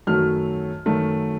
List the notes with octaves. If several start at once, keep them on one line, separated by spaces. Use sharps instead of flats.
F#2 D#3 F#3 A3 F6
F#2 D#3 F#3 A3